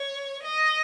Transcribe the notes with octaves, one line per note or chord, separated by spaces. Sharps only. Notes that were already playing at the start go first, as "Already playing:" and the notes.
Already playing: C#5
D#5